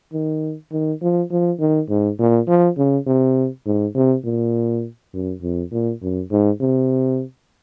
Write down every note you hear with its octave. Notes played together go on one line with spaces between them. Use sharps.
D#3
D#3
F3
F3
D#3
G#2
A#2
F3
C#3
C3
G#2
C3
A#2
F#2
F2
A#2
F#2
G#2
C3